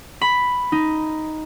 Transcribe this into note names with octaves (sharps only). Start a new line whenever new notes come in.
B5
D#4